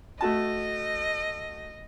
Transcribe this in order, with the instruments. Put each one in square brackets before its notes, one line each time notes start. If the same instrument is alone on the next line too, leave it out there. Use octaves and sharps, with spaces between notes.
[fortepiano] A3 F#4 A5 [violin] D#5